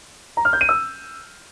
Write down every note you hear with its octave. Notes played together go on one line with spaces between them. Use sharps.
A#5
F6
G6
D#7
E6